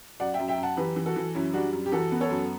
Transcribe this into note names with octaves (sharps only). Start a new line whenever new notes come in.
F#2 D5 F#5
E5 G5
F#2
E5 G5
F#2
F#5 A5
E3 G4 B4
E3
F#4 A4
E3
F#2 C#4 E4
G3 D4 F#4
F#2
G4
E3 F#4 A4
B3
A4 C#5
F#2